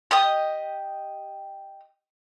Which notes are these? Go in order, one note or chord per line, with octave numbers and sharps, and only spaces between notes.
G4 D#5 D#6